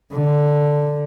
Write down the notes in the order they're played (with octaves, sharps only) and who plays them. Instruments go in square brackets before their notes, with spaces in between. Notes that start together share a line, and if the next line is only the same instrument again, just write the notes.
[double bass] D3